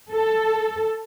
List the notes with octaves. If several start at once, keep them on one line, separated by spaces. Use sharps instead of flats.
A4